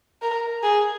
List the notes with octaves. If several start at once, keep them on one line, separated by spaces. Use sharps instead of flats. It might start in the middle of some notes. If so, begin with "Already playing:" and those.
A#4
G#4